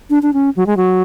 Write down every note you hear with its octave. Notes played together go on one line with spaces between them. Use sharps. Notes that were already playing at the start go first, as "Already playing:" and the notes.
D4
D4
C#4
F#3
G#3
F#3